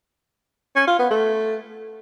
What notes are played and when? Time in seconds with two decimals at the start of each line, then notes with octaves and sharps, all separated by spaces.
0.76 C#4
0.88 F4
0.99 B3
1.10 A3